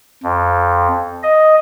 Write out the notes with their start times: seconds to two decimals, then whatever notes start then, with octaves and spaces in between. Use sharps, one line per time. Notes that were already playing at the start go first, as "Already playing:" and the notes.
0.23 F2
1.23 D#5